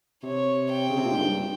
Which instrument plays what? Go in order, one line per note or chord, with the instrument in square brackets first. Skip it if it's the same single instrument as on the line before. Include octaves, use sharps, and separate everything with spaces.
[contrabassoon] C3 [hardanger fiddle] C#5
[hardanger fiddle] G5
[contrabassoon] C#3
C3
A#2
G#2
G2